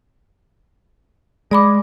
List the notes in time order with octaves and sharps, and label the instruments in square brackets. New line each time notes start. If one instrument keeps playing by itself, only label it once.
[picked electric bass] G#3 [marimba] D5 B5 D6